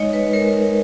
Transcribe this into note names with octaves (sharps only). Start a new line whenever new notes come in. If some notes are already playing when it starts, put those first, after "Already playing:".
Already playing: G#3 D#4 C#5 D#5
B4
G#3 A#4